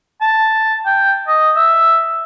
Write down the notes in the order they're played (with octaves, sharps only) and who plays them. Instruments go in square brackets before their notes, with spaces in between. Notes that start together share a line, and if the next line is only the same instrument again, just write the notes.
[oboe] A5
G5
D#5
E5